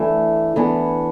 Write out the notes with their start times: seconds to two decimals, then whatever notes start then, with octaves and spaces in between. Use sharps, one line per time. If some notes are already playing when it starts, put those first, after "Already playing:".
Already playing: E3 A3 D4
0.56 E3 B3 D4